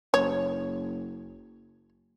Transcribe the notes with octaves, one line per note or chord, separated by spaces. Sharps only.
F#1 C#5